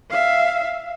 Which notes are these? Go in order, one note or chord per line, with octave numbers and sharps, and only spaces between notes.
E5 F5